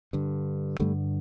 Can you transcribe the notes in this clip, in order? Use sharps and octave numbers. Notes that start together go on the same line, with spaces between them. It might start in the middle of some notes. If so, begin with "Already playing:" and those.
G2 D3
G2 D3 G3 A3